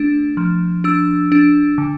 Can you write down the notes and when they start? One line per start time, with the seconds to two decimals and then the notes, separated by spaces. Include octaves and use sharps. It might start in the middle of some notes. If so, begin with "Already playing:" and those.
Already playing: A3 D4
0.37 F3
0.84 D4 E6
1.32 D4
1.78 D3